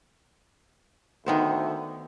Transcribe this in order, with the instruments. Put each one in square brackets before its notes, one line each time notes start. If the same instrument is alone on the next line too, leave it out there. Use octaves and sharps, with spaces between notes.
[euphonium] D2 [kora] D#3 B3 C5